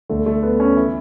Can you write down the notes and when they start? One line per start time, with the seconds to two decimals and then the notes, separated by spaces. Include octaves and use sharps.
0.10 D2 D3 A3
0.26 A3
0.43 B3
0.60 C#4
0.77 E3 E4